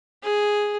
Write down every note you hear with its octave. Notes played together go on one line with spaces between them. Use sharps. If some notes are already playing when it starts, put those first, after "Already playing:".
G#4